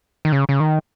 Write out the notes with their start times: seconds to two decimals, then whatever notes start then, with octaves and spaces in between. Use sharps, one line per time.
0.25 D#3
0.32 C#3
0.49 C#3
0.60 D#3